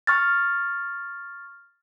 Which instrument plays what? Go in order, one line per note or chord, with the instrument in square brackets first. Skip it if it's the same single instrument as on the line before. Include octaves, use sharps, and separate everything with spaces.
[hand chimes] C#6 F6 A6